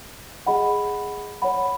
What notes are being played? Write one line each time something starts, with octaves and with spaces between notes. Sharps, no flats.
G#4 D#5 F#5 B5
C#5 F#5 B5